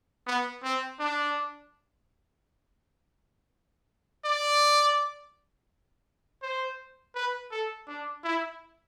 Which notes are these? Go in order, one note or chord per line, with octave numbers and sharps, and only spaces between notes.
B3
C4
D4
D5
C5
B4
A4
D4
E4